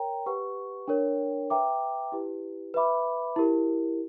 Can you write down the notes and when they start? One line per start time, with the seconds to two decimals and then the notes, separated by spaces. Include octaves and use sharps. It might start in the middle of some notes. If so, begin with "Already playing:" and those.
Already playing: A#4 C#5 G5 A#5
0.26 G4 B4 F#5 C#6
0.88 D4 A#4 C#5 G5
1.50 B4 E5 G5 A#5 D6
2.12 E4 G4 B4
2.74 B4 E5 B5 D6
3.36 E4 G4 A#4